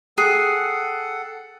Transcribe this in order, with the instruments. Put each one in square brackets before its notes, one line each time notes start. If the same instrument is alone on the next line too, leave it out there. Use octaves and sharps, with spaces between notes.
[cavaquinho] G#4 [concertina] A4 F#5 [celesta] G5 F#6 C7